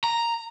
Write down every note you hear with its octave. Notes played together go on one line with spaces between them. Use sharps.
A#5